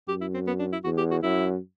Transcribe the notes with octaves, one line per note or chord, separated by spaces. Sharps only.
F#2 G4
E4
C4
B3
D4
E4
E2 F#4
G4
F#4
F#2 E4